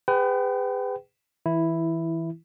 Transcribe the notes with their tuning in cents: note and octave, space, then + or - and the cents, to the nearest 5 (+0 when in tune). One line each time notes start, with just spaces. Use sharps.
G#4 -35 B4 +30 G5 -30
E3 -20 E4 +0